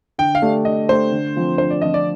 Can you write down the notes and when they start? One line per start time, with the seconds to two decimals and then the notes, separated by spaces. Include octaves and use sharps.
0.18 D3 G5
0.35 F5
0.42 A3 D4 G4
0.65 D3 D#5
0.88 A3 D4 G4 C5
1.12 D3
1.35 F3 C4 F4
1.58 D3 C5
1.70 D5
1.82 F3 C4 F4 D#5
1.94 D5